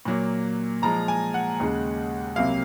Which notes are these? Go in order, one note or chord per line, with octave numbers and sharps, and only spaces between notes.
A#2 F#3 A#3
A#2 F3 G#3 A#5
G#5
F#5
D#2 C#3 G#3
C2 C3 F#3 A#3 F5